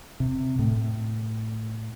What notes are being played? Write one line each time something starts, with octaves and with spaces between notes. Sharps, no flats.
C3
A2